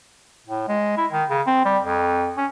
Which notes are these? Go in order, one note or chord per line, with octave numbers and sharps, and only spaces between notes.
A2
G#3
E4
D#3
C#3
C4
G3
F2
C#4